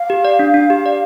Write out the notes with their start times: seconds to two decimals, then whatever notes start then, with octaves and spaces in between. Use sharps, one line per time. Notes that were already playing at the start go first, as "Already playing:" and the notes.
Already playing: F5
0.10 G4
0.25 D5
0.39 D4
0.54 D4
0.70 G4
0.86 D5